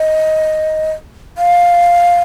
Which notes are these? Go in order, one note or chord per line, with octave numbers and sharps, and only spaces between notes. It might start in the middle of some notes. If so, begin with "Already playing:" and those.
Already playing: D#5
F5